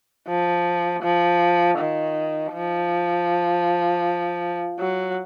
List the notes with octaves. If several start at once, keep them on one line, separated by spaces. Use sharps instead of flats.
F3
F3
D#3
F3
F#3